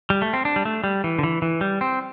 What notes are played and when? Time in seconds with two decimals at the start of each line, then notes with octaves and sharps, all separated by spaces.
0.10 G3
0.22 A3
0.33 C4
0.45 D4
0.56 G3
0.65 A3
0.84 G3
1.04 E3
1.19 D3
1.23 E3
1.42 E3
1.61 G3
1.81 C4